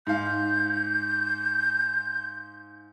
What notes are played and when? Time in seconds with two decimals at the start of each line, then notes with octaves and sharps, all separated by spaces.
0.07 G#2 F5 G6